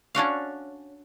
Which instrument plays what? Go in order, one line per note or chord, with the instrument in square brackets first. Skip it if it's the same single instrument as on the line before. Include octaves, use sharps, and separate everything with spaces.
[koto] C#4 D4 F#4 F5